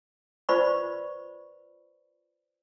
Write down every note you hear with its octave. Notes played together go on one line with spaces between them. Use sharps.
F4 B4 C5 D5 B5 C#6